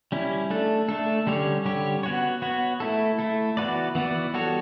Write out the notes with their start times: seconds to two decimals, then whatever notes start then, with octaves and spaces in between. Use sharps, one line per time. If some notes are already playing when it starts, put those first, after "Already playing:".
0.12 G3 C#4 E4
0.50 A3 D4 A4
0.89 A3 D4 A4
1.27 D3 G3 C#4 G4 C#5
1.65 D3 G3 C#4 G4 C#5
2.03 B3 F#4 C#5
2.42 B3 F#4 C#5
2.80 A3 E4 A4
3.19 A3 E4 A4
3.57 E3 B3 F#4 B4 D5
3.95 E3 B3 F#4 B4 D5
4.34 G3 B3 F#4 A4 C#5